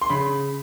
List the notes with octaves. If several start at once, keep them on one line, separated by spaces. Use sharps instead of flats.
C6
C#3 B5